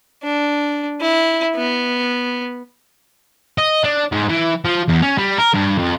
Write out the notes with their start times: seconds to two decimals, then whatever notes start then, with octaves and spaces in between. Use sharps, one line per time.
0.24 D4
1.01 E4
1.56 B3
3.58 D#5
3.84 D4
4.12 G#2
4.29 E3
4.65 F3
4.88 E2
5.02 C#4
5.18 G3
5.38 A#4
5.54 G2
5.78 F2